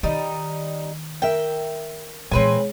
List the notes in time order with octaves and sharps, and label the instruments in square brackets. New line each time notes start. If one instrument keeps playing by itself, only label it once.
[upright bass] D#3 [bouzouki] G3 D#4
[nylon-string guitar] A#4 E5 [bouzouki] G5
[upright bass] A#2 E3 [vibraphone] G#3 G#4 C#5 [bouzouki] C4 B4 G#5